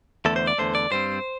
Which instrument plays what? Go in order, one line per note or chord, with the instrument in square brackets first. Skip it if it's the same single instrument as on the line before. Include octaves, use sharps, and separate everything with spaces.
[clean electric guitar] E2 D3 A3 A4
C5
D5
E2 D3 A3 C5
D5
G2 G3 C4 C5